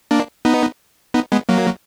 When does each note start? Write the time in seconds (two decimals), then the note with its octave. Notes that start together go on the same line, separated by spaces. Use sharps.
0.11 A#3 D4
0.45 B3 D#4
1.14 B3 D#4
1.32 G#3 B3
1.49 F#3 A#3